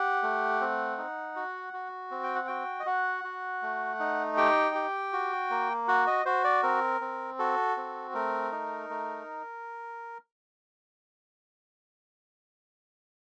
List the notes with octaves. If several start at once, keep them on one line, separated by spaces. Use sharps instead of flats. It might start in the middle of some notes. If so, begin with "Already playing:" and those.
Already playing: G4 F#5
A3
C4
D#4
F#4
F#4
C4
G5
F#5
F#4 G5
D#5
F#4 F#5
F#4
A3
D#4
G4 G5
G4
F#4
A#3
F#4 F#5
D#5
F#4 C5
D5
C4 A#4
C4
F#4 A4
C4
A3 A#4
D#4
A3